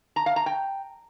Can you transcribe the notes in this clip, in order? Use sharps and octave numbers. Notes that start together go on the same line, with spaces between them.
A#5
F5
A#5
G5